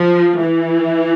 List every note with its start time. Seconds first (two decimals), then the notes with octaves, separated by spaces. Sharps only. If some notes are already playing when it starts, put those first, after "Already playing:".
Already playing: F3
0.43 E3